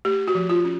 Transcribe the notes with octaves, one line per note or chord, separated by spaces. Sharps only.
A3 G4
F#4
F3
F4
C#4